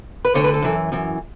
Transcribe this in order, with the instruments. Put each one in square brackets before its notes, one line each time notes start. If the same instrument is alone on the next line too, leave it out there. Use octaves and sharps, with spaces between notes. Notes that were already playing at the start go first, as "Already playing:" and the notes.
[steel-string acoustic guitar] B4
D2 D3 C#5
B4
A4
F#2 E3
F#2 E3